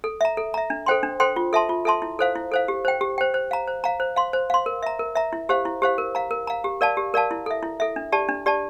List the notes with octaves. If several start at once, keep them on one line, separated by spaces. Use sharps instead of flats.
A4
E5 A#5
A4
E5 A#5
D4
A4 C5 G5 C6
D4
A4 C5 G5 C6
F4
A4 E5 A5 C6
F4
A4 E5 A5 C6
E4
A4 C5 F5
E4
A4 C5 F5
G4
C5 G5
G4
C5 G5
C5
F5 A#5
C5
F5 A#5
C5
F5 C6
C5
F5 C6
A#4
E5 A#5
A#4
E5 A#5
E4
G4 C5 F5
E4
G4 C5 F5
A#4
F5 A#5
A#4
F5 A#5
G4
A#4 D5 F5 A5
G4
A#4 D5 F5 A5
E4
A4 E5
E4
A4 E5
D4
G4 D5 A5
D4
G4 D5 A5